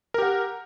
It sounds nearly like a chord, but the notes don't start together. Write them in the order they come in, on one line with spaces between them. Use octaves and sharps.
A#4 G4 F#5